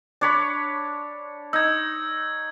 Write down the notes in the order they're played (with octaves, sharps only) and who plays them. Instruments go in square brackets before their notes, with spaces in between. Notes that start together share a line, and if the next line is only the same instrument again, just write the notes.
[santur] D4 C#5 B5
[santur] D#4 [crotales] E6 G#6